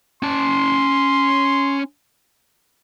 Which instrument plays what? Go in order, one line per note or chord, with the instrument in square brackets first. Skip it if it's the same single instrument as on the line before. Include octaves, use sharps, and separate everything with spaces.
[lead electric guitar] C#4 A5 [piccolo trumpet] C6